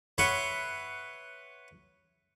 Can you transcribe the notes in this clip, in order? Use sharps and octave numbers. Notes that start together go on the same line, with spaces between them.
B4 C#5 E5 F#5 C6